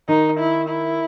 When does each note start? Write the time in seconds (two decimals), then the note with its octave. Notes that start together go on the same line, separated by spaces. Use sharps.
0.08 D#3 D#4
0.39 E4
0.69 E4